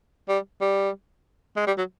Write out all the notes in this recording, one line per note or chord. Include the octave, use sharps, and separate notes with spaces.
G3
G3
G#3
G3
F#3